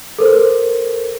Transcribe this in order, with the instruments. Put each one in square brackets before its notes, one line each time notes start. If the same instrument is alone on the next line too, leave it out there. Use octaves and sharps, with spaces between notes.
[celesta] A4 A#4 C5